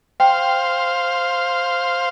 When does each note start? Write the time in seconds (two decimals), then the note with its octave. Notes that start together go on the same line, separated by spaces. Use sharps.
0.20 C5 F5 G5